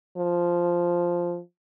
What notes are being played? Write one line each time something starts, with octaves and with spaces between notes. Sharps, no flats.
F3